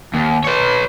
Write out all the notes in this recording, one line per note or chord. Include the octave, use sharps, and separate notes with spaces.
D#2
B4 C#5